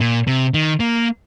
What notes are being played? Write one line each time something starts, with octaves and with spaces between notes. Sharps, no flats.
A#2
C3
D#3
A#3